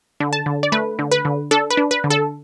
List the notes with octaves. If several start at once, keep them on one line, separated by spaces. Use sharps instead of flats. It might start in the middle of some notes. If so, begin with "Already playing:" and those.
D3
A5
D3
D5
A3 B4
D3
B4
D3
D4 A4
B4
D4
B4
D3
A4